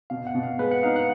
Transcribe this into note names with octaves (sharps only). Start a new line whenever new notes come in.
B2 F5
F#5
B2
F5
G#3 B4
F#5
D#4 F5
F#5